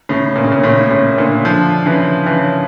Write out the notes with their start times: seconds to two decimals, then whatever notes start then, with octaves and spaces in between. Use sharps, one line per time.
0.09 A2 C#3
0.36 A#2
0.44 C#3
0.52 A#2
0.63 A2 C#3
0.91 A2 C#3
1.18 A#2 D3
1.45 D3 F3
1.86 C#3 E3
2.26 C#3 E3